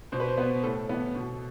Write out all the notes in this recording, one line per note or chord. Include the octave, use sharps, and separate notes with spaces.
B2 C5
B4
C5
B3 B4
A2 A4
E3 B3
B2